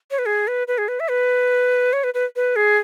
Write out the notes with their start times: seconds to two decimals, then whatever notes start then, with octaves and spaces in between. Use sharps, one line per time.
0.11 C#5
0.19 B4
0.26 G#4
0.48 B4
0.68 B4
0.78 G#4
0.88 B4
1.00 E5
1.10 B4
1.93 C#5
2.04 B4
2.14 B4
2.36 B4
2.56 G#4